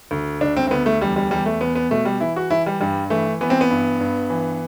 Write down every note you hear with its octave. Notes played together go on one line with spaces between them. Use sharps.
D2
D2 D4
C4
C4
D2 B3
A3
E2 G3
G3
E2 G3
A3
E2 B3
B3
B2 A3
G3
E3 E4
F#4
E3 E4
G3
G2 G3
E3 A3
E3 B3
C4
B3
G2
G2
E3